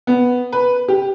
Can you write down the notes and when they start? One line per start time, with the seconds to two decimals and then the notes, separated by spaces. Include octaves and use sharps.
0.07 B3
0.53 B4
0.88 G4